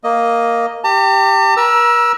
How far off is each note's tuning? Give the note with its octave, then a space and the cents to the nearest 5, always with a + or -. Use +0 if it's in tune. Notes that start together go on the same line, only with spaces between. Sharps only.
A#3 +0 D#5 +0
G4 +0 A5 +45
A#4 +40 A#5 +25 E6 +0